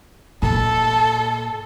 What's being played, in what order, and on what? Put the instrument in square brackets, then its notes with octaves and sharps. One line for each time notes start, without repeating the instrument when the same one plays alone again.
[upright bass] A#2 [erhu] A4